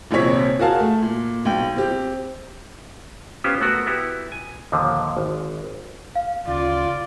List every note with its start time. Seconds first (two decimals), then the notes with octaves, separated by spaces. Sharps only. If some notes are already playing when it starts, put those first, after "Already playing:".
0.11 D#1 A#1 C3 C4 C#5 B6
0.59 F#4 G#4 A#4 F5 A5
0.80 A3
1.02 A#2
1.45 B1 G5
1.76 C4 G4
3.44 B3 C#4 F4 G4 C5
3.61 A3 B3 F#4 A#4
3.87 B3 E4 F#4 G4
4.32 G#5
4.72 D#2 A#2 D3 F3
5.17 G#1
6.16 F5
6.48 D2 C#3 F4 D5